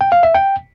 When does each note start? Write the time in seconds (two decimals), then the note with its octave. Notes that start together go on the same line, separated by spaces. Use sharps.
0.01 G5
0.12 F5
0.23 E5
0.34 G5